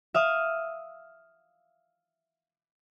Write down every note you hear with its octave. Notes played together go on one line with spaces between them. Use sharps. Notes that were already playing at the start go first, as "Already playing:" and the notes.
E5 F5 D#6